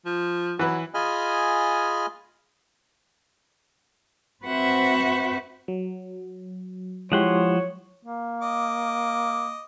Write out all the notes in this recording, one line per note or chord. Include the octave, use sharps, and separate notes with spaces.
F3
E3 F#3 B4
F4 G#4 D#5 G#5 B5 F6
C4 F#4 B4 C5 E5 F#5
F#3
F3 G#3 E4 G4 C#5 F#5 C6
A#3
D#5 D6